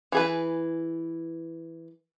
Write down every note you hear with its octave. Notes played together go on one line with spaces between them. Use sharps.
E3 G#4 B4